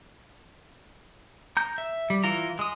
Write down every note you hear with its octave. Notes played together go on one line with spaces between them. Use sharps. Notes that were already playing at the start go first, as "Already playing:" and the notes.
A#5 G6
E5
G3
E3 F4 A#5
G#3 D#6